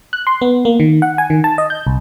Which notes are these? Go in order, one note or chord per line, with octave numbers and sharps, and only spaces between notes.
F#6
C6
B3
A#3
D#3
F#5
G#5
D#3
A5
D#5
G6
C2